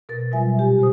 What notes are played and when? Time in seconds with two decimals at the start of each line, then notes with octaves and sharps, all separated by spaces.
0.09 B2 A#4 A6
0.32 B2 F#3 G3 F4 E5 G#5
0.58 A#2 G4 G#5
0.79 C#3 C5 D#6